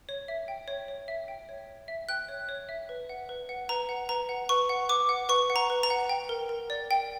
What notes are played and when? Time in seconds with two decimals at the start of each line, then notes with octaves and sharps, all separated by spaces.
0.09 C#5
0.28 E5
0.48 G5
0.68 C#5
0.88 C#5
1.08 E5
1.28 G5
1.49 C#5
1.69 C#5
1.88 E5
2.09 G5 F#6
2.29 C#5
2.49 C#5
2.69 E5
2.89 B4
3.09 F#5
3.29 B4
3.49 F#5
3.69 B4 A#5
3.89 F#5
4.09 B4 A#5
4.29 F#5
4.49 B4 C#6
4.69 F#5
4.89 B4 D6
5.09 F#5
5.29 B4 C#6
5.50 F#5
5.56 A#5
5.70 B4
5.83 A#5
5.90 F#5
6.09 G5
6.29 A#4
6.49 A#4
6.70 D5
6.91 G5